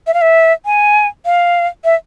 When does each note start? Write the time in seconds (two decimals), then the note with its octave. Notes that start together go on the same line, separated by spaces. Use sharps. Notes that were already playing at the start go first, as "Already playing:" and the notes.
0.07 E5
0.14 F5
0.21 E5
0.66 G#5
1.26 F5
1.84 E5